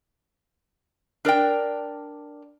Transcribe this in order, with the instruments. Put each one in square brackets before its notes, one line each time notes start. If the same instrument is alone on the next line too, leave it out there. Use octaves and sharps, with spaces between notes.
[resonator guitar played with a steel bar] D4 A#4 D5 G5